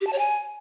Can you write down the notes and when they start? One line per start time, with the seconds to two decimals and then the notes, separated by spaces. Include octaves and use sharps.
0.01 G4
0.07 A5
0.13 C#5
0.19 G#5